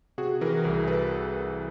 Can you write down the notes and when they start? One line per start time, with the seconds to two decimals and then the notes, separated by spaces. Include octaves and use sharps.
0.18 C3 F#4 G#4
0.41 E3 G#4 A#4
0.64 C2 G#4 A#4
0.88 A4 B4